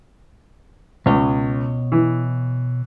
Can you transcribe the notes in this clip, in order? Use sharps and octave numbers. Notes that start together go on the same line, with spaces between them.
C#2 B2 C#5 D#5
E3